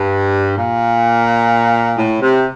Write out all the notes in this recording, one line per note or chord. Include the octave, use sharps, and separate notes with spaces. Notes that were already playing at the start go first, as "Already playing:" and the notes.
Already playing: G2
A#2
A2
C3